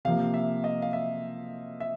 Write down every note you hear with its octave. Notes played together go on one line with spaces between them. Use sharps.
C3 F3 A#3 F5
E5
D#5
F5
E5
E5